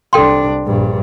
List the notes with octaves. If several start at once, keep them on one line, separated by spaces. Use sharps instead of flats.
C2 D4 A4 G5 C6
A#1 G2